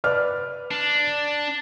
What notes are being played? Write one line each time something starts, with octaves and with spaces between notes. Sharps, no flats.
B4 D5 F6
D4